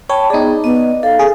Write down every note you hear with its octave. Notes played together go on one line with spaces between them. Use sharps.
C#5 G5 A5 B5
B3 D#4 G#4 D5
B3 D#5
A4 F5
G#4